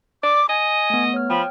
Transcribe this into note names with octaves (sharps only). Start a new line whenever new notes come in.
D5 D6
D#5 G#5
A3 B3
C#5 F6
F3 G5 B5